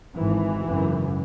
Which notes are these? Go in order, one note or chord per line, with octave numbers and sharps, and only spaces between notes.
G#1 G#2 E3
G#1 F#2 C#3